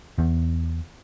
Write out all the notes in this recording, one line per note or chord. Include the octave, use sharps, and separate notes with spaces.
E2